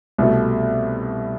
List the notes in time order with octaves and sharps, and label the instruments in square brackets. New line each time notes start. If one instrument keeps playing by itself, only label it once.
[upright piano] C2 B2 A3